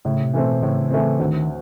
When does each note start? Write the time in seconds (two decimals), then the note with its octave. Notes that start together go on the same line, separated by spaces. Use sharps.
0.05 A2 C#3
0.24 C3
0.34 E3 A3 C4
0.43 B2
0.62 A2 C#3
0.90 E3 A3 C4
1.19 D2 D#3